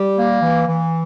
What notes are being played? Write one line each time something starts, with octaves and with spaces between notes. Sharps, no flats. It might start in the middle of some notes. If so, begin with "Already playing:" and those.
Already playing: G3 G4
A#3
E3
E3